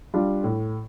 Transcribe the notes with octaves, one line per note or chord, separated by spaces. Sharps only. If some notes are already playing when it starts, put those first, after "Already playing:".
G3 D4 F4
A2